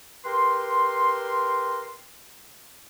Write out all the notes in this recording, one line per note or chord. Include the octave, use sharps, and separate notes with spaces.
G4 A#4 B4 C6